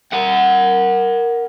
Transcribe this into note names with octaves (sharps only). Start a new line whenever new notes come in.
A#4 F#5